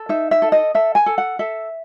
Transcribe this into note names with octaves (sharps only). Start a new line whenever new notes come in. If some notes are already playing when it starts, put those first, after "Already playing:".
Already playing: A4
D#4 E5
E5
A4
D#5
A4 E5
G#5
A4
F#5
A4 E5